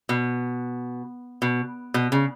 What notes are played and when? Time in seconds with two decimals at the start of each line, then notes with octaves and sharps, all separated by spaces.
0.09 B2
1.42 B2
1.94 B2
2.12 C#3